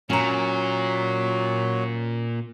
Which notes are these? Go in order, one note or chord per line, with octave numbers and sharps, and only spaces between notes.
A#2 F#3 C#4 A#5